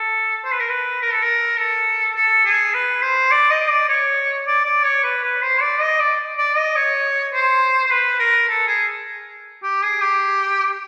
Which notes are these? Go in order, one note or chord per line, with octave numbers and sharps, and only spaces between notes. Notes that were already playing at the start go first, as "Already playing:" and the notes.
Already playing: A4
C5
B4
A#4
B4
A#4
A4
A#4
A4
A4
G#4
B4
C5
D5
D#5
D5
C#5
D5
D5
C#5
B4
B4
C5
D5
D#5
D5
D5
D#5
C#5
C5
C5
B4
A#4
A4
G#4
G4
G#4
G4